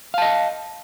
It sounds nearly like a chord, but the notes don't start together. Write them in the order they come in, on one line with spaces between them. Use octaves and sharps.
F5 A5 D#5